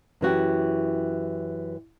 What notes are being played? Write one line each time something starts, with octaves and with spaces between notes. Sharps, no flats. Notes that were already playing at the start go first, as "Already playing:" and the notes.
F#2 E3 F#4 G4